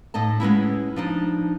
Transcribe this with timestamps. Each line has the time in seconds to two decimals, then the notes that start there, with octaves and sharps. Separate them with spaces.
0.14 A2 D#4 D#5 A5
0.40 G#3 B3 C#4 E4
0.96 F3 D4 D#4